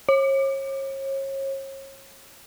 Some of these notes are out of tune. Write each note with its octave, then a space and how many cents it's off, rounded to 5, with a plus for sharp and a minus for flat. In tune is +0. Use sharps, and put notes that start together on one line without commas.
C#5 -35